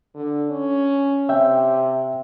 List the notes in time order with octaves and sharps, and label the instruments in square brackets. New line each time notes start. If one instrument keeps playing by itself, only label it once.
[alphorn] D3
C#4
[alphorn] C3 [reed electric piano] E5 G5